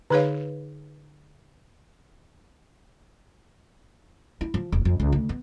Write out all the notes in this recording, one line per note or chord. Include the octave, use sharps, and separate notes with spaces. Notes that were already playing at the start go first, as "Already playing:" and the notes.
D3 D#4 G#4 B4 C#5 F5
E4
F3
E1
F2
C#2
D2
B3